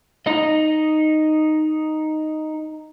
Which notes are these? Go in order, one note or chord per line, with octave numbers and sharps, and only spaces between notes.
D#4 D#5